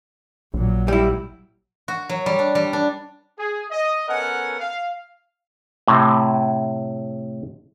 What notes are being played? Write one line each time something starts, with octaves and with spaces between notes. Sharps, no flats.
A#1 A#2 F#3
G3 E4
F#4
F#3
G3
D4
G3
D4
G#4
D#5
B3 C#4 A4 A#4 F#5 G#5
F5
A2 C3